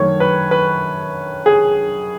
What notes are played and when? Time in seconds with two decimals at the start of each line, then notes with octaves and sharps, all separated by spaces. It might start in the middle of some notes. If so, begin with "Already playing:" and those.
Already playing: F#2 D#3 A3 C#5
0.20 B4
0.51 B4
1.46 G#4